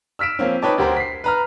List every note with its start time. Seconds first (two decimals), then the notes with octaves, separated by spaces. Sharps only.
0.19 E6 F6 B6 D7 E7
0.39 F3 A#3 C4 C#4
0.62 D#4 B4 C#5 G5 A5 D6
0.78 D2 G4 A#4 C5
0.96 B6 C7
1.24 B4 A#5 F6